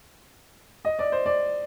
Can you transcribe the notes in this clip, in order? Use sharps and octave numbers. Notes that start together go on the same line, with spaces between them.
D#5
D5
C5
D5